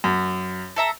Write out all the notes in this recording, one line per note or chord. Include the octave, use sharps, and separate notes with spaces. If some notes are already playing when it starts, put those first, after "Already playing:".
F#2
A4 E5 A#5